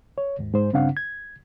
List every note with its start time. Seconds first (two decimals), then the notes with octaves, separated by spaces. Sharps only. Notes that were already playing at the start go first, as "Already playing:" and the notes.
0.18 C#5
0.39 D#2 G#2
0.54 G#2 C5
0.73 G2 C#3 C4 D4 F5 F#5
0.97 G#6